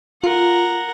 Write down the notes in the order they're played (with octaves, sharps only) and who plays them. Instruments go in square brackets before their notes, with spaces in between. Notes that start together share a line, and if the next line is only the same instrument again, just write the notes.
[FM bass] F4 [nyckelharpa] A#4 F#5